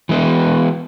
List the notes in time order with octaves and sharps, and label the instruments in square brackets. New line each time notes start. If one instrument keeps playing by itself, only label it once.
[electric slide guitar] E3 G#3 B3